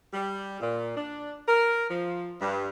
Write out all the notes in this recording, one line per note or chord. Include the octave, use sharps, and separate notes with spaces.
G3
A#2
D4
A#4
F3
G2